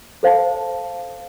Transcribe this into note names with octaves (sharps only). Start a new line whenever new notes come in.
A4 C5 F5 A5